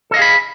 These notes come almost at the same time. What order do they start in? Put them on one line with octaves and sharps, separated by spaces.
A4 D#5 F5 G#4 B5